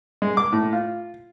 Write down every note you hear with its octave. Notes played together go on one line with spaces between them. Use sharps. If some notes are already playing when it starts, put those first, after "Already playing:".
G#3
D6
A2
F4